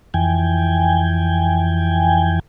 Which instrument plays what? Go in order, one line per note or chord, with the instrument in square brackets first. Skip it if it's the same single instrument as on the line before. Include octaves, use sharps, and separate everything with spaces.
[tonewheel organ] F2 E3 G5 G#5